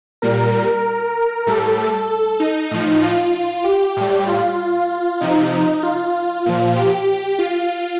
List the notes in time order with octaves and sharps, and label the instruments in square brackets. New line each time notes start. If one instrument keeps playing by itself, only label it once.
[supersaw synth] A#2 G3 A#4
A2 G3 A4
A4
D#4
A2 F3
F4
G4
A2 G3
F4
C3 F3 D#4
F4
A#2 F3
G4
F4